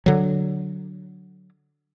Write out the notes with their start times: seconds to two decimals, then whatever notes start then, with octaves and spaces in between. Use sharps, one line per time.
0.06 D3 F#3